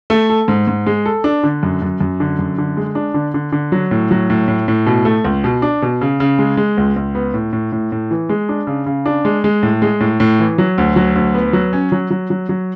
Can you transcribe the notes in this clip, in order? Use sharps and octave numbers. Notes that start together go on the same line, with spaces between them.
A3
A4
G#2
G#2
G#3
A4
D4
D3
F#2
F#2
F#2
D3
F#2
D3
G#3
D4
D3
D3
D3
F#3
A2
F#3
A2
A2
A2
B2
A3
C#2
B2
D4
B2
C#3
C#3
G#3
G#3
C#2
C#2
B3
A2
A2
A2
A2
E3
G#3
D4
C#3
C#3
D4
G#3
G#3
A2
G#3
A2
A2
E3
F#3
D2
F#3
D2
B3
F#3
C#4
F#3
F#3
F#3
F#3